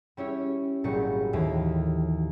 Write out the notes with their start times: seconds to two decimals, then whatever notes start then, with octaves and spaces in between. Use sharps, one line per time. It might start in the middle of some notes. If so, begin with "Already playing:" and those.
0.17 G3 C#4 E4 C#5
0.84 G#1 A#2 F#3 G3 C#6
1.33 D#2 A2 E3